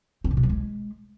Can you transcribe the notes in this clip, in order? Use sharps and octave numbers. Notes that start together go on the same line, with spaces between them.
C4
A#2
B2
G3
G#3